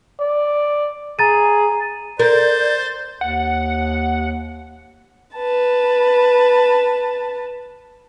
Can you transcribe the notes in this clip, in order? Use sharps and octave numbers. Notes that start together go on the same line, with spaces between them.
D5
G#4 A#5 A6 D#7
A#4 C5 D5 G6 A6
D#2 F#5
B4 A5